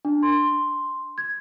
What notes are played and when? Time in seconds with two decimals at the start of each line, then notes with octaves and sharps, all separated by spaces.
0.05 D4
0.23 C6
1.18 G#6